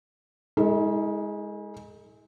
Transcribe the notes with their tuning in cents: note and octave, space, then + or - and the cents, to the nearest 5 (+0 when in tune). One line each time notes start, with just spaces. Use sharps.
G#3 +0 E4 -45 A4 +40